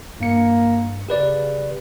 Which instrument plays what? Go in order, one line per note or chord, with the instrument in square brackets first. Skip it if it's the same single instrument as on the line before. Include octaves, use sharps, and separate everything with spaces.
[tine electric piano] G2 C#7 [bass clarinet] A#3
[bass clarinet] C#3 [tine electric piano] G4 B4 D5